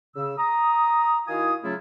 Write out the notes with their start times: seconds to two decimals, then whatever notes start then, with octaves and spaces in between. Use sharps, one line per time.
0.16 C#3 E6
0.38 A#5 D#6
1.27 D#3 E4 F#4 F5 G#5 D#6
1.64 C#3 F#3 A3 C#4 E4 F4